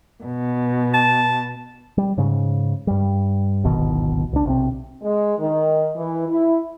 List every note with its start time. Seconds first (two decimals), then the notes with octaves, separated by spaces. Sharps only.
0.24 B2
0.94 A5
1.98 G3
2.18 G#2 C#3
2.87 G2 G3
3.64 D1 G#1 B2 D#3
4.33 C#2 D4
4.45 B1 C3 C4
5.03 G#3
5.39 D#3
5.96 E3
6.28 E4